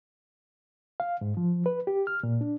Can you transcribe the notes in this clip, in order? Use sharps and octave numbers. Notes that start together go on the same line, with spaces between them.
F5
G#2
F3
B4
G4
F6
A#2
D4